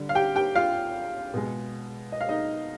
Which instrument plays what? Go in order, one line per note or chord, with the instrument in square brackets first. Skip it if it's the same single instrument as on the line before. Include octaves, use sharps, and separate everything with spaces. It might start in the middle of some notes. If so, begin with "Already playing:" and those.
Already playing: [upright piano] D3 G3
F5
G4 G5
G4 G5
F4 F5
B2 G#3
D#5
F5
D#4 D#5